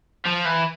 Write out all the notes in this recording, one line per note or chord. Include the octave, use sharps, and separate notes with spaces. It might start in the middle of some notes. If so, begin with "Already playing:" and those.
F3
E3